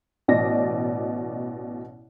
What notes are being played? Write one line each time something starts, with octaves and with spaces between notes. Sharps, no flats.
A1 B2 D5 D#5 A#6